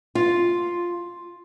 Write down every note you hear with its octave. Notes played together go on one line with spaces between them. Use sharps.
F4